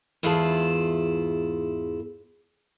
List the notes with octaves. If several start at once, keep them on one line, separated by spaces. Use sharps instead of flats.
E2 G#2 E4 F4 G#4 A5